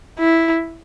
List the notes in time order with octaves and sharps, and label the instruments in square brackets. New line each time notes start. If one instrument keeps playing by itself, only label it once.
[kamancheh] E4